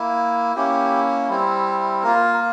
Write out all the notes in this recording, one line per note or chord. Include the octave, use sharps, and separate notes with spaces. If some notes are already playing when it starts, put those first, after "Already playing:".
Already playing: A#3 E4
A#3 C#4 E4 G4
G3 C4 E4
A#3 F4 A#4
A#4